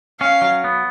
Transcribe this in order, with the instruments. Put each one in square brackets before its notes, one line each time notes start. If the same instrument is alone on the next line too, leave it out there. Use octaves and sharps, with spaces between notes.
[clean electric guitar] C#4 [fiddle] F5
[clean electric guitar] F#3
B3